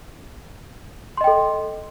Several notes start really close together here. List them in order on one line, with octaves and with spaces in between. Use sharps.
C6 D#5 G5 A4